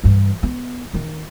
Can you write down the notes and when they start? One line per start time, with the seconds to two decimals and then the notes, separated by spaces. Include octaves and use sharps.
0.04 G2 E3
0.43 B3
0.94 D#3 D#4